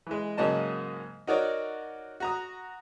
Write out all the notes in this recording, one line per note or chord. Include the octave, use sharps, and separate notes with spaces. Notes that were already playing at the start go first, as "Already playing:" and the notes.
E3 G#3
G#2 C#3 F#3 A#3 D#5 A5
D#4 F#4 A#4 C#5 D5
F#4 A#5 D#6